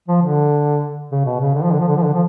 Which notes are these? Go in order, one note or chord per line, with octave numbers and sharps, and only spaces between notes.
F3
D3
C#3
B2
C#3
D3
F3
D3
F3
D3
F3
D3
F3